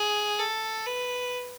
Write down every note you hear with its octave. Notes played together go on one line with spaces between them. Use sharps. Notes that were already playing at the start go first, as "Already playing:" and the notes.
Already playing: G#4
A4
B4